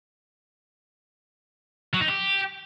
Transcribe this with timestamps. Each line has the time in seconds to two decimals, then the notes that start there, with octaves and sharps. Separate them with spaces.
1.93 F#3
2.01 D#4
2.08 G4